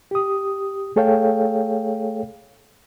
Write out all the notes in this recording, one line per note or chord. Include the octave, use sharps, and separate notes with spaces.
G4 D#6
A3 G#4 A4 C#5 F5 G5